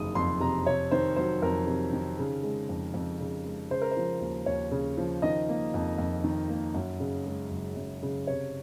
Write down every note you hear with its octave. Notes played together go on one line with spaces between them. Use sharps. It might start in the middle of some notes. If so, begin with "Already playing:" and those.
Already playing: F#1 F2 C3 D#3 D#6
F2 C6
C3 A#5
C3 C#5
D#3 C5
F#3 C5
F2 A#4
C3
D#3
C#3
G#3
F2
F2
C#3
G#3
C#3 C5
A#4
C5
F3
D#2
D#2 C#5
C#3
F3
D#3 D#5
A#3
F2
F2
D#3
A#3
F#2
C#3
G#3
F#1
F#2
C#3
C3 C#5